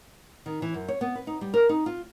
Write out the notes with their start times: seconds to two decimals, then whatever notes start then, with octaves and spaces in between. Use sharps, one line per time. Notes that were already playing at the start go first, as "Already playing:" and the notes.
0.46 D#3
0.62 E3
0.74 F#2
0.88 C#5
1.01 B3
1.16 B4
1.27 D#4
1.41 G3
1.54 A#4
1.69 D#4
1.86 F4